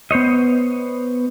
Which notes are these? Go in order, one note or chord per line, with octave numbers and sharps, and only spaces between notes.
B3 C5 C#5 D#5